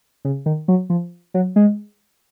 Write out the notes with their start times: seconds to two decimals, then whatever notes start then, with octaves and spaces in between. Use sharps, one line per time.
0.25 C#3
0.46 D#3
0.68 F#3
0.90 F3
1.34 F#3
1.56 G#3